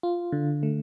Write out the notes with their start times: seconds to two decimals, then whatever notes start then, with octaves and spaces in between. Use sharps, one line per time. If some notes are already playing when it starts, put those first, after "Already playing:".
0.03 F4
0.32 D3
0.63 A3